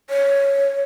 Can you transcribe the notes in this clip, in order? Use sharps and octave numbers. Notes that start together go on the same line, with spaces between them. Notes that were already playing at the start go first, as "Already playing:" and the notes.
C#5